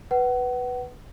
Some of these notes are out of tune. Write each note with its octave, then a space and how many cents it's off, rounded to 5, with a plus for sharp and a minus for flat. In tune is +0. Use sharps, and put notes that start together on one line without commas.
B4 +0 F#5 +30